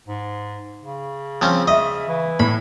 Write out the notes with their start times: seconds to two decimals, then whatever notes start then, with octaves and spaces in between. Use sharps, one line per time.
0.08 G#2
0.82 C#3
1.42 F3 C4 C#4
1.68 D#5 E5
2.09 E3
2.40 A2 B5